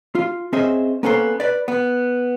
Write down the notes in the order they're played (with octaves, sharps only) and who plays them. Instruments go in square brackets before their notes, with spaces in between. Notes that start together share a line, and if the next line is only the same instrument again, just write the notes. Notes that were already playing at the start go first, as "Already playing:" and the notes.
[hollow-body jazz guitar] F4
C4 C#4 G#4 C5 D#5 E5
A#3 B3 C#4 A4 C5
B4 D5
B3